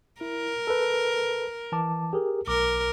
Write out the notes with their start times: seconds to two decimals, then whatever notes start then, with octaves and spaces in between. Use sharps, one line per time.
0.21 E4 A#4
0.67 A4 B4
1.72 E3 A5 D6
2.13 G4 G#4 A#4
2.47 B1 A#4 D6